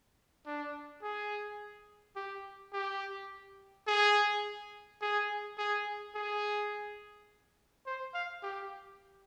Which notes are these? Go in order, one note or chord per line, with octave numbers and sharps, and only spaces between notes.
D4
G#4
G4
G4
G#4
G#4
G#4
G#4
C5
F5
G4